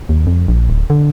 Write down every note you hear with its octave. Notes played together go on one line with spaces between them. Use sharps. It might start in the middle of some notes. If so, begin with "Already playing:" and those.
D#2
F2
A#1
D1
D3